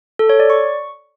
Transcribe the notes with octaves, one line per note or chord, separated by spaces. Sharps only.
A4
C#5
D5
C#6